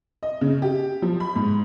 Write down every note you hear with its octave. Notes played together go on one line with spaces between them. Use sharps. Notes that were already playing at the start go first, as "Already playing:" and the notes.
D#5
C#3
G4
F3
B5
G#2